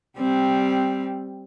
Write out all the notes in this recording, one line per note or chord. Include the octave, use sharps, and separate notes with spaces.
G3 C4